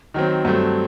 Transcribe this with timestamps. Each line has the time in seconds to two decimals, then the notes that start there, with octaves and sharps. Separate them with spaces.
0.14 D#3 F#3 C4
0.45 G2 F#3 A3 C4